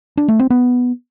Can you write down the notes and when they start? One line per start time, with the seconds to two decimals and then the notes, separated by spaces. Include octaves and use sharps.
0.17 D4
0.28 A3
0.39 C4
0.50 B3